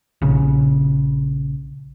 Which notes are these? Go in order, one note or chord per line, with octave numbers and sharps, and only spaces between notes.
A#1 C#3